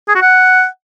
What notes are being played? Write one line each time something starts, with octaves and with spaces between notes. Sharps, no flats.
G#4
F#4
F#5